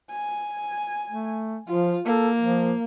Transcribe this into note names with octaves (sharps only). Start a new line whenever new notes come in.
G#5
A3
F3 F4
A#3 A4
F3